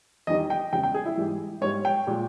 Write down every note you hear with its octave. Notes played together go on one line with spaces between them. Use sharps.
E2 D#3 G3 D#5
G5
E2 C#3 G#3 G5
G5
G#4
E4
G#2 E3 G3
G#2 G3 C#5
G5
A#2 G#3